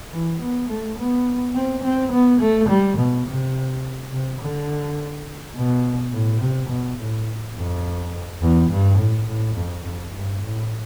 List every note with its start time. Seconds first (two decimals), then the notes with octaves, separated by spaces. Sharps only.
0.12 E3
0.41 B3
0.69 A3
0.98 B3
1.54 C4
1.83 C4
2.12 B3
2.41 A3
2.69 G3
2.97 B2
3.27 C3
4.12 C3
4.41 D3
5.56 B2
6.13 A2
6.41 C3
6.69 B2
6.98 A2
7.56 F2
8.41 E2
8.70 G2
8.98 A2
9.27 A2
9.55 F2
9.84 F2
10.13 G2
10.41 A2